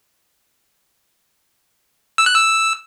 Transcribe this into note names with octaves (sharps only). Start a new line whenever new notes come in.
E6
F#6
E6